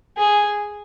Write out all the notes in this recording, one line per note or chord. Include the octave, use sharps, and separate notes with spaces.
G#4